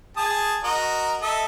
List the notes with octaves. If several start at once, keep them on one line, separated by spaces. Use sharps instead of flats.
G#4 A5 D#6
F#4 A#4 D#5
A4 D#5 E5